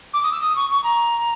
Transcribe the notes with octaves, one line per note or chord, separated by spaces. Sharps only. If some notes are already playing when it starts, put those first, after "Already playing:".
D6
D#6
E6
D#6
C#6
C#6
A#5